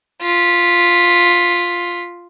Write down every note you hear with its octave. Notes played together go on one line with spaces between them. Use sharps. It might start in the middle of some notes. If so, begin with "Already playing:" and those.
F4 B6